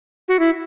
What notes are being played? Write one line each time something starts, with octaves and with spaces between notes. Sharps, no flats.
F#4
E4